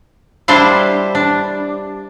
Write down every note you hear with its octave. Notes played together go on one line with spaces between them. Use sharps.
G3 D4 E4 C5 F5
D4